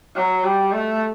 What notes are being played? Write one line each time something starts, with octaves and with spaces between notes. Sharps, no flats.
F#3
G3
A3